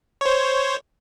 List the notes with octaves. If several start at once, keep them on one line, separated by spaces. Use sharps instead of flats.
C5 C#5